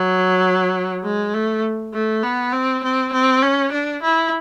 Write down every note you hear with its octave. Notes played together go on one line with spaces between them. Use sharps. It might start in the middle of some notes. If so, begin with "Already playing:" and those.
Already playing: F#3
G#3
A3
A3
B3
C4
C4
C4
C#4
D4
E4